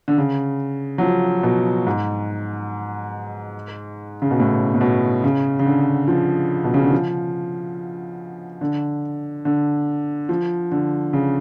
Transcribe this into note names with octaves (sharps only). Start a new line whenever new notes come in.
D3
C#3
F#3
F3
B2
G#2
C#3
B2
A2
A2
B2
C#3
C#3
D3
F3
B2
C#3
D3
F3
D3
D3
F3
D3
C#3